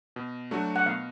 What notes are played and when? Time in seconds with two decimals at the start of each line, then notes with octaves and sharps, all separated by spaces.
0.16 B2
0.51 F#3 A3 D4 F#4
0.76 F#5
0.86 B2 F5